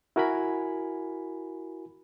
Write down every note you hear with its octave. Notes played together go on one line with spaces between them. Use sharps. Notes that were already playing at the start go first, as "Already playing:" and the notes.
E4 F#4 A#4 G#5 B5